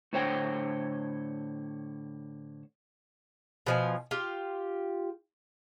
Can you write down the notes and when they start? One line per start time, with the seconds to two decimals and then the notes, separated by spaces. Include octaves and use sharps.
0.13 A2 D3 C5 C#5 F#5 G5
3.66 B2 F3 G#5
4.11 F4 G4